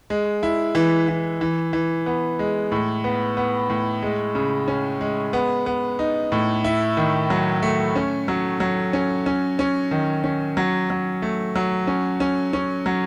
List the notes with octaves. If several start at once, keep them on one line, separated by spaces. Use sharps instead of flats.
G#3
E4
E3
E3
E3
E3
B3
G#3
A2
B3
B3
A2
G#3
C#3
C#4
G#3
B3
B3
D#4
A2
E4
D#3
F#3
A3
C#4
F#3
F#3
C#4
C#4
C#4
D#3
C#4
F#3
F#3
A3
F#3
C#4
C#4
C#4
F#3